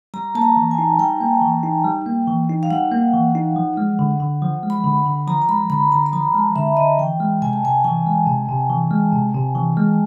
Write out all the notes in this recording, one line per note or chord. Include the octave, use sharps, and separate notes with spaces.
G3 A#5
A#3 A5
A#5
E3
G#5
D#4
G3 G5
A#3
E3
D#4
G3
A#3
E3
D#4
F5
G3 F#5
A#3
E3
D#4
F3
G#3
D3
D3
F3
G#3
B5
D3
D3
F3 A#5
A#5
G#3 B5
D3 B5
D3 A#5
B5
F3 A#5
G#3 A5
D3 E5
D3 D#5
E3 G5
G#3
C3 G#5
A5
C3 G#5
E3 G#5
G#3
C3
C3
E3
G#3
C3
C3
E3
G#3